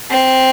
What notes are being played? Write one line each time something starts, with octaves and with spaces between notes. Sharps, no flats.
C4